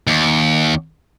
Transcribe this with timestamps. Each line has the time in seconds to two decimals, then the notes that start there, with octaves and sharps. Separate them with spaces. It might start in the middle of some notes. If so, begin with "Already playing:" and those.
0.07 D#2